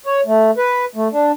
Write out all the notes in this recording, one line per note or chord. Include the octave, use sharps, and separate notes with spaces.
C#5
A3
B4
A3
D4